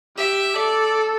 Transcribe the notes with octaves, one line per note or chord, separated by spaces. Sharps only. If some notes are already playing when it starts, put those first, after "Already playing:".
G4 E5
A4 D5